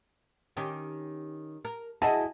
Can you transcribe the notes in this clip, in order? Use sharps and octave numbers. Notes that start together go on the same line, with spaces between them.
D#3 C#4 G4
A#4
E4 F#4 G#4 D#5 A5